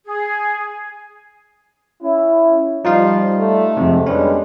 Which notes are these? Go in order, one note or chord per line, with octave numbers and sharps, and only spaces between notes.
G#4
C#4 E4
F3 G3 D#4 F4 F5
A3
F2 G#2 C3
G3 G#3 B3 C#4 D4